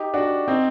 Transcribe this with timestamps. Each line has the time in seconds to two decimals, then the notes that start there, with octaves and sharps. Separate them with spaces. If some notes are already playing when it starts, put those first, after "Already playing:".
Already playing: D#4 G4
0.14 D4 F#4
0.48 C4 D#4